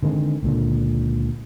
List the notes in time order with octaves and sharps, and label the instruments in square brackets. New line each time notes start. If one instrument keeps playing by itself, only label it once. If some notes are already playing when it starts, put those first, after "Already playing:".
[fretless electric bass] D3 D#3 G#3 C4
C#2 A#2 D3